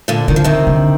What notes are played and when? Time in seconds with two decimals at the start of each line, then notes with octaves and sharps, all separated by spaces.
0.08 A#2 D3
0.28 D3 D#3
0.36 F3
0.44 C3 D#3
0.67 D3